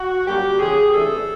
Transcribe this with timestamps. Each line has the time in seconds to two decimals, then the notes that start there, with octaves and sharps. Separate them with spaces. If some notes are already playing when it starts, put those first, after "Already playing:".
Already playing: F#4
0.26 F#2 D3 G3 A#3 G4
0.59 E2 C#3 F3 G#4
0.93 E2 C3 E3 A3 D4 A4